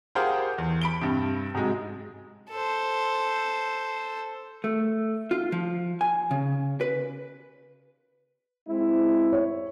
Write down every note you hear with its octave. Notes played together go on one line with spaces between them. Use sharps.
F4 G4 G#4 A#4 C5 F#5
E2
B5 D7 G7
G2 C3
G#2 C3 F#3 G#3
A4 C5
A3
F4
F3
G#5
C#3
B4
G#3 C4 E4
C#5